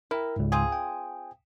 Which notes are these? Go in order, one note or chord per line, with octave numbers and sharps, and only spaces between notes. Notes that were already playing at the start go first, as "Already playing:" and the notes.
E4 A#4 E5 G5
C#2 G#2
C4 F4 G#4
G5